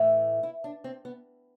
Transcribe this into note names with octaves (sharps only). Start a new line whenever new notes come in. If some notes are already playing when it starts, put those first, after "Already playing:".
Already playing: A2 E3 A3
E4
D4
C4
B3